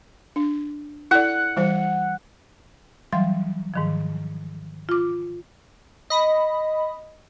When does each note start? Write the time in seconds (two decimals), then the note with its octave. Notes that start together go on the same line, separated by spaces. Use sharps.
0.36 D4
1.11 E4 A4 D5 F#5
1.57 E3 G3 C5
3.13 E3 F#3 G3 F5 C6
3.74 G#2 D#3 F3
4.89 F4 D6
6.10 D#5 B5